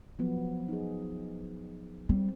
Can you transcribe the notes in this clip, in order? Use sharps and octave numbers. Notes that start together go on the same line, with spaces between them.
F3 F#3 B3
D#4 G#4
G3 C4